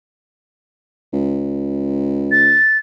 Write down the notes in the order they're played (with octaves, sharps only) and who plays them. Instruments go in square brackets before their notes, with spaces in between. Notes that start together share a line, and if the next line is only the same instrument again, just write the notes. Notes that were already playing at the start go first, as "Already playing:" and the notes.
[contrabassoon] C#2
[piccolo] A6